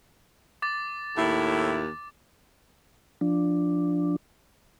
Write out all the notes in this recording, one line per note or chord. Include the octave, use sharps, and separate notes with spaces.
D6 A6
D#2 A2 E4
F3 D4